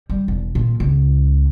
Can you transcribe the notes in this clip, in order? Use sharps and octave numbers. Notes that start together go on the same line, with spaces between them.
G3
E1
A#2
C#2